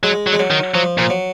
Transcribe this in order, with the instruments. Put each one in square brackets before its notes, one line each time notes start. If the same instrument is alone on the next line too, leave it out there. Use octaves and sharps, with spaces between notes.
[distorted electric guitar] F#3 [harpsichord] G#3
[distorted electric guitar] F#3
[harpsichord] G#3
F#3
[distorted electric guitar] D#3
[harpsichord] F3 [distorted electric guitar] F#3
[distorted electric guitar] A#2 [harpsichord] F3
[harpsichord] F#3